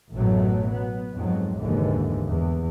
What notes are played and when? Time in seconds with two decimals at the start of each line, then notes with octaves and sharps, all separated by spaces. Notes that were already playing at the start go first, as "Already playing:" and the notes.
0.15 A1 F#2 B2 F#3 A3
0.70 B3
1.15 F2 G#2 F#3
1.61 F1 D#2 G#2 D3 E3
2.26 E2